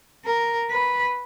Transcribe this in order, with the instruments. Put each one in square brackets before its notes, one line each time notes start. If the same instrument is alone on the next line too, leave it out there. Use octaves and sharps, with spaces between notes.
[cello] A#4
B4